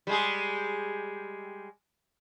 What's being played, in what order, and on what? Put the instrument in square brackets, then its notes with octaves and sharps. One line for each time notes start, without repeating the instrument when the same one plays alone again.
[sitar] G3 G#3 G#4